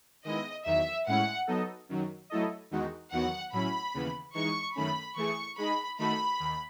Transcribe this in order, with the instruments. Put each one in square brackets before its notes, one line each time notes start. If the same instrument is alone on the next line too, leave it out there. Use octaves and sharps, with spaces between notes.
[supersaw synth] D#3 G#3 B3 E4 [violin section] D#5
[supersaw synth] E2 D#3 F#3 [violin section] E5
[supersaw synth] A2 G#3 C#4 E4 [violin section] F#5
[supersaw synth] F#3 B3 D#4 A4 D#5
F#2 D#3 F#3
F#3 A3 E4 A4 D#5
E2 D#3 G#3 D#4 F#4
[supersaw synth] E2 D#3 F#3 B3 F#4 [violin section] F#5
[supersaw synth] A2 F#3 C#4 E4 [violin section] B5
[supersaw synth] D#2 C#3 E3 B3
[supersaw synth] E3 G#3 D#4 [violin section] C#6
[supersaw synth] F#2 D#3 A3 C#4 [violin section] B5
[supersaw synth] E3 A3 E4 G#4 [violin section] C#6
[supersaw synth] G#3 D#4 G#4 D#5 [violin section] B5
[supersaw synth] D#3 A3 D#4 F#4 A4 [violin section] B5
[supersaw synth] D#2